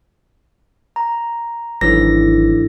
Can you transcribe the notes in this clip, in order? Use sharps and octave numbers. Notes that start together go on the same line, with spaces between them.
A#5
G#1 G#2 E3 F#3 D4 E4 A4 A#6